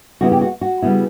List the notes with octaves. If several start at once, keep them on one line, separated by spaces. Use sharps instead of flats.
C#3 G3 B3 E4 F#4
G4
F#4
F#4
C#3 G3 B3 E4